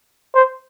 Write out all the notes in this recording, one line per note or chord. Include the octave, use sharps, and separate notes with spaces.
C5